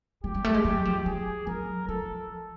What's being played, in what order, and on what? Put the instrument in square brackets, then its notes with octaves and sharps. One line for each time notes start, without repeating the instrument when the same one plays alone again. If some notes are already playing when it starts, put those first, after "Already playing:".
[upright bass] F#3 [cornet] G4
[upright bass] G3
A3
G#3
F#3
F3
[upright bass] F3 [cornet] G#4
[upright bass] F#3 [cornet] A#4
[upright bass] F3 [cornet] A4